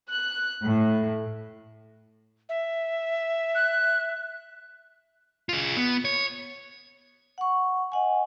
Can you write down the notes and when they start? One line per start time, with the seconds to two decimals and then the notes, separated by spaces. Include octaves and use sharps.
0.10 F#6
0.64 A2
2.49 E5
3.55 F#6
5.49 F4 G#4
5.77 B3
6.05 C#5
7.38 F#5 C#6
7.92 D#5 F#5 G#5